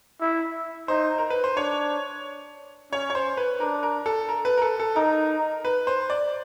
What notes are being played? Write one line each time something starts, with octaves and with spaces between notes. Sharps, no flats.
E4
D#4 C5
A#4
B4
C5
D4 C#5
C#4 C#5
C#5
C5
B4
D4 A#4
A#4
A4
A#4
B4
A#4
A4
A4
D#4 A#4
B4
C5
D5